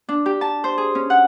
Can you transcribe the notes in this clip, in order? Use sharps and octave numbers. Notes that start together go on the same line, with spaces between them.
D4
G4
A5
C5
G#4
C#4
F#5